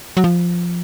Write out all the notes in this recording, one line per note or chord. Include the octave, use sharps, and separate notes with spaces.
F#3
F3